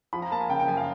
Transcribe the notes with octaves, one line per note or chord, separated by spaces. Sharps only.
F3 B5
A#5
A#3 A5
G#5
C#3 G5
G5
F#2 G#5
F5